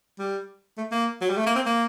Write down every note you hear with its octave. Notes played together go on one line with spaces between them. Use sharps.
G3
A3
A#3
F#3
G3
A3
A#3
C4
A#3